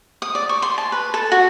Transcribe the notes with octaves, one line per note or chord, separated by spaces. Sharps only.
D#6
D5
C#6
C6
A5
B4
A4
F#4